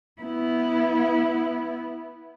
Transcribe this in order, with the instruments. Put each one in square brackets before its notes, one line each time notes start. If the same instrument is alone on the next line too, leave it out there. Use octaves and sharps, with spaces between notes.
[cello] B3 E4